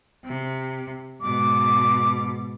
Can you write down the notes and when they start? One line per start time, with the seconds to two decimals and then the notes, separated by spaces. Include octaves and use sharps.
0.24 C3
1.21 G#2 B2 D6